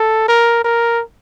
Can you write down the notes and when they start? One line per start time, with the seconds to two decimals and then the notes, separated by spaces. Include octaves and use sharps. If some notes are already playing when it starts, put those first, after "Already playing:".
Already playing: A4
0.28 A#4
0.64 A#4